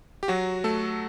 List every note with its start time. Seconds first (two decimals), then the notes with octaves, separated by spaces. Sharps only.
0.23 G4
0.28 F#3 F#4
0.64 A3 A4